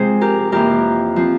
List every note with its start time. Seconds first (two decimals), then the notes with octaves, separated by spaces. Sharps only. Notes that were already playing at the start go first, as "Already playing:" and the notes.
Already playing: C3 F3 G#3 C4 G#4 C5
0.21 G4 A#4
0.52 F2 E3 A#3 G4 A#4
1.16 F3 C4